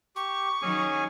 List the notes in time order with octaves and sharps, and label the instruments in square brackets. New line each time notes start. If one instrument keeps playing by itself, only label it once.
[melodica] G4 [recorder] C#6
[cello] D#3 F#3 [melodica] C#4 G#4 G#5